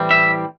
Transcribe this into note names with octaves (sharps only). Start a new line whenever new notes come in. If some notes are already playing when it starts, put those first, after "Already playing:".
Already playing: A2 E3 G3 C4 E4
E5